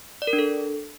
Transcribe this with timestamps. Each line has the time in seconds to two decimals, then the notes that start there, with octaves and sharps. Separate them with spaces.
0.22 D5
0.27 A#4
0.33 D4
0.39 A4